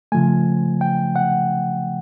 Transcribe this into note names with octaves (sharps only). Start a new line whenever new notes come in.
C#3 F3 A3 G#5
G5
F#5